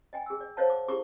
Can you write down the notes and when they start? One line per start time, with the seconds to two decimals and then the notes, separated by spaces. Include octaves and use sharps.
0.13 D#5 G5 G#5
0.26 G#4 E6
0.41 D5
0.57 C5 C#5 D#5 F5 F#5 A5
0.70 D6
0.88 E4 G4 G#4 A#4 C#6 D6